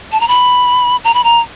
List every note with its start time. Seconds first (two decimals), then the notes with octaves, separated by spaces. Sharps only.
0.12 A5
0.21 A#5
0.28 B5
1.04 A#5
1.14 B5
1.24 A#5